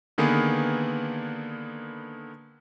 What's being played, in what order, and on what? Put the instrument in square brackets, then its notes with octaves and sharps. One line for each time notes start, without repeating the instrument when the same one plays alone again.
[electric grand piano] D3 D#3 A#3 B3 G#4 B4